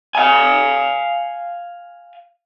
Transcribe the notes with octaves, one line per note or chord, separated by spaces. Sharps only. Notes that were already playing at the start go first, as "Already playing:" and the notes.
F5 G#5